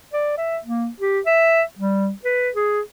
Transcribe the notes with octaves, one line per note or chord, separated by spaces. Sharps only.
D5
E5
A#3
G4
E5
G3
B4
G#4